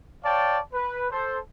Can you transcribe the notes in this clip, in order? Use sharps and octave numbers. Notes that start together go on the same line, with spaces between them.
C#5 D5 F5 G5 A5
B4
A4 C5